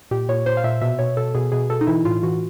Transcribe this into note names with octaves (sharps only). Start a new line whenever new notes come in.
A#2 G4
A#2 C#5
A#2 C5
F5
A#2 E5
B2 E5
B2 C#5
B2 A4
B2 G#4
B2 G#4
B2 A4
D#4
E3 E4
A2 F4
E3 F#4